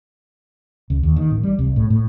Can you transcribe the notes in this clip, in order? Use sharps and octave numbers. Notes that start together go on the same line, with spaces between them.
C#2
D#2
D#3
A1
G3
C2
A2
A2